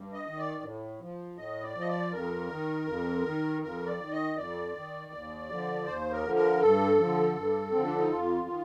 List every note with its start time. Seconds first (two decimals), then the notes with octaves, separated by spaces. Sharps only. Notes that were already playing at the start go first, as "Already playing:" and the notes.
Already playing: G2
0.13 D#5
0.26 D#3
0.38 D5
0.62 A2
1.00 F3
1.37 A2 D#5
1.62 D5
1.75 F3
1.80 D#5
1.87 D5
2.11 F2 A#4
2.49 D#3
2.86 F2
3.24 D#3
3.62 F2 A#4
3.86 D5
3.99 D#3
4.11 D#5
4.36 F2 D5
4.74 D#3
5.12 D#2
5.49 D3 F3
5.86 D#2 C5
6.11 A#4
6.24 D3 F3
6.35 A#4
6.60 G2 A4
6.98 D3 F3
7.35 G2
7.71 D3 F3 C4
7.84 D4
7.97 D#4
8.10 F2 F4
8.48 D#3